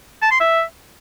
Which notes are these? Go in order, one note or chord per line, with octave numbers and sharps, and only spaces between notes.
A5
C6
E5